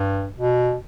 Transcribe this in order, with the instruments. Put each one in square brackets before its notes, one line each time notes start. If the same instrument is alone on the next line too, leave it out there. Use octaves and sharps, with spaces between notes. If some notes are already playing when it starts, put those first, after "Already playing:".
Already playing: [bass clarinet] G2
B2